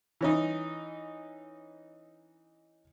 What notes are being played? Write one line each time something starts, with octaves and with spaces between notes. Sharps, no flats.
E3 C#4 D#4